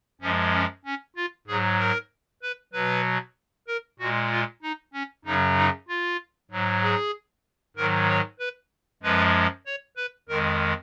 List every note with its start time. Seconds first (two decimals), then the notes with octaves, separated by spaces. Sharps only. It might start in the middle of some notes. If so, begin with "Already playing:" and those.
0.21 F#2 F3 G#3 C#4
0.53 C#4
0.85 C#4
1.16 F4
1.48 G#2 F#3 G#4
1.79 A#4
2.43 B4
2.73 B2 F#3 B4
3.67 A#4
4.00 A#2 G#3 F#4
4.31 F4
4.62 D#4
4.93 C#4
5.25 F#2 C#3 F#3 D#4
5.57 D#4
5.88 F4
6.51 G#2 F#3
6.83 G#4
7.77 G#2 D#3 F#3 A#4
8.09 C#5
8.39 B4
9.03 F#2 F3 G#3 B4
9.66 C#5
9.97 B4
10.29 F2 D#3 G#3 A#4